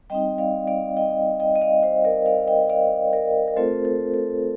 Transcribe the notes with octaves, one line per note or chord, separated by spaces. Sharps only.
G3 C4 D#4 D#5 G5
D5 F5
D5 F5
D#5 G5
D#5 G5
D#5
D5 F5
C5 D#5
A#4 D5
D5 F5
D#5 G5
D5 F5
A#4 D5
A#4
A3 C4 F4 A4 C5
A4
A4